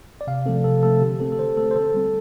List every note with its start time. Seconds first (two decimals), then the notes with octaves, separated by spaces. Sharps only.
0.21 D5
0.27 C3 F5
0.46 F3 A3 C4 A4
0.64 C3 A4
0.83 F3 A3 C4 A4
1.01 D3 G4
1.20 A3 C4 A4
1.32 A4
1.39 D3 C5
1.57 A3 C4 A4
1.71 C5
1.76 D3 A4
1.94 G3 C4